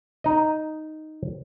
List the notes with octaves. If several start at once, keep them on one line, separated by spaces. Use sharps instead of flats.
D#4 D#5